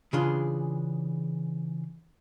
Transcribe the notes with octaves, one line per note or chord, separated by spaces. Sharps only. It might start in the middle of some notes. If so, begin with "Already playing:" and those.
C#3 E3 D4 F4 G#4 C6